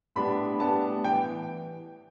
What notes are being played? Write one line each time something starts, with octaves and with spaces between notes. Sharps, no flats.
A2 G3 B3 D4 B5
A2 G3 B3 D4 A5
E3 G5